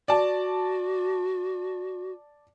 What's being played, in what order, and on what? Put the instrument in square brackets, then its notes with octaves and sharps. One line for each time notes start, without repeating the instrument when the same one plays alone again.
[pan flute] F#4 [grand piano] D5 A5